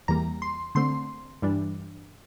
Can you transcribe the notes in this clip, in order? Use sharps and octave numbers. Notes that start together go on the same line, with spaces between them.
E2 E3 G3 A#3 A#5
C6
D3 A3 C4 C6
G2 E3 G3 D4